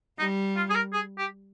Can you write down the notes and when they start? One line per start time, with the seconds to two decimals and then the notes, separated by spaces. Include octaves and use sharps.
0.19 G3 D#4
0.56 F4
0.70 G#4
0.75 A#4
0.93 G#4
1.18 G4